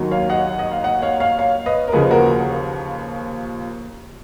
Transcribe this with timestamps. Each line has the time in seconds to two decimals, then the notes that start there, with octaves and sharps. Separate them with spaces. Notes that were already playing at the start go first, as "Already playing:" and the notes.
Already playing: D#2 D#3 F#3
0.11 C#5 F5
0.29 D#5 F#5
0.59 D#5
0.71 F5
0.84 D#5 F#5
1.02 C#5 F5
1.20 C#5 F5
1.39 C#5 F5
1.66 B4 D#5
1.88 A#4
1.92 D#2 C#3 F3 G#4 B4
2.11 F#4 A#4